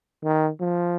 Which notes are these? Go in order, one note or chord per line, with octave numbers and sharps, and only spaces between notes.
D#3
F3